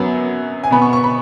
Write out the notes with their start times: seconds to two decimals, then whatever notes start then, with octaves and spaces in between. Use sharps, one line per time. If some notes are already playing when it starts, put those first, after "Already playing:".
Already playing: F#2 F#3 B3
0.64 G#5
0.71 B2 B3 B5
0.82 C#6
0.93 C#6
1.04 B5